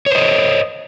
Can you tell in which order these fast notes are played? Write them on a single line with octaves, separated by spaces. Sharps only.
C#5 C5 D#5